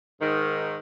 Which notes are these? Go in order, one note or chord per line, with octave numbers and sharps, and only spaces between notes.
G#2 D#3